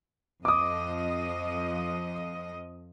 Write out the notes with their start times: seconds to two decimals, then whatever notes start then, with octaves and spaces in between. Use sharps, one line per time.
0.45 F2 F3 D#5 D6 D#6